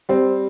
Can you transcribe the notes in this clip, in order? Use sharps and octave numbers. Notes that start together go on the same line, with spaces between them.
G3 C4